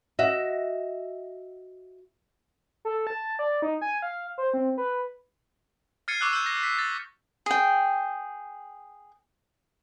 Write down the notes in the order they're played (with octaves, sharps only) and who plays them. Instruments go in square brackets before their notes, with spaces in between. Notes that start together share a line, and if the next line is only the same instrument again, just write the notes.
[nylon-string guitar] F#4 D#5 E5
[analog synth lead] A4
A5
D5
D#4
G#5
F5
C5
C4
B4
[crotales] F6 G#6 A6 C7 C#7 D#7
C#6 D6 E6 F#6
E6 G6
A#6
B6
A6
[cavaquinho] G#4 G5